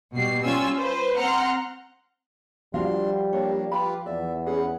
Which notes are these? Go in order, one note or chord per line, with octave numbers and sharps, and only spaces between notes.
B2 G3 C7
G3 C#4 F4 G#5 E6
B4 C5
C4 F#5 A#5 C6 F6
F3 G3 D4 F4 F#4 F5 C6
A#3 D4 C#5
F4 G4 B4 B5
E2 D5 E5
C#4 G#4 B4 F#5